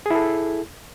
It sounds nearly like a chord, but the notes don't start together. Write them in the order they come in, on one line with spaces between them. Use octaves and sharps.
G#4 E4 A4